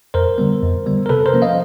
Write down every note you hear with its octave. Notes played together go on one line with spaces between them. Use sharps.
F2 A#4 C5
D3 G3 B3
F2
D3 G3 B3
A#4
C3 A4 B4
A#4 C5
F3 A#3 C#4
D#5 F5